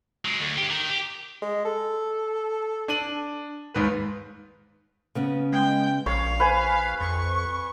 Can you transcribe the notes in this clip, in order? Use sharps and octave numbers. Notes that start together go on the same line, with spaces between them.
F#3 G#3
D2
D4 G4
D#3
G4
G#3
A4
D4 D#7 F#7
D#2 G#2 B4
C#3 B3 C#4
G#3 G5
A#1 C#5 F5
B4 C5 G#5
F2 C#6